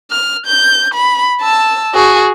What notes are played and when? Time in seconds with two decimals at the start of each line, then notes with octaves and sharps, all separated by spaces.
0.11 F6
0.46 G6
0.94 B5
1.41 A5 E6
1.94 F#4 G#4